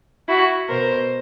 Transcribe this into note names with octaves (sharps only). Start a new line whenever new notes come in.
E4 F#4
B2 A#4 C5